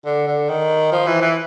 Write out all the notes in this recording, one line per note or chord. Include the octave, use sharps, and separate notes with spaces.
D3
D3
D#3
F3
E3
E3